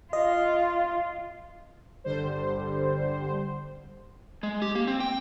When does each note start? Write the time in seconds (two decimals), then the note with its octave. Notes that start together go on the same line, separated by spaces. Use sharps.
0.13 F4 D#5
2.04 G1 D3 G3 C5
4.43 G#3
4.62 G4
4.75 A#3
4.87 C4
5.00 G5